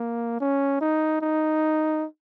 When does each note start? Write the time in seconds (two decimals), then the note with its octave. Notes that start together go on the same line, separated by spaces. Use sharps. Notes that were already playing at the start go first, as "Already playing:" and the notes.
Already playing: A#3
0.40 C#4
0.81 D#4
1.21 D#4